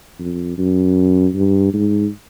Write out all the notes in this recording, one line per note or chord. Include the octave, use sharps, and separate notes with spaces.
F2
F#2
G2
G#2